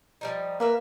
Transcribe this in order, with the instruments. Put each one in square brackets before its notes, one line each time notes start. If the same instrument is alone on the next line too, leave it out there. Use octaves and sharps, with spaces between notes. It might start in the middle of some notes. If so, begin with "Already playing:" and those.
[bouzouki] F3 G3 D#4
[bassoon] A#3 [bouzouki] B4 E5 F5